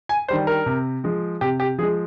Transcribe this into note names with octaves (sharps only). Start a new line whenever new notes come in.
G#5
D#3 G3 D4 C5
A#4
C3
F3 G#3
C3 G4
G4
F3 G#3 G#4